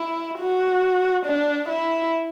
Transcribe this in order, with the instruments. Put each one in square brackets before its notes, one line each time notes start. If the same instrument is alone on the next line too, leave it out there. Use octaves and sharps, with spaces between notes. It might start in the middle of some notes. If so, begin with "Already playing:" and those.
Already playing: [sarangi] E4
F#4
D4
E4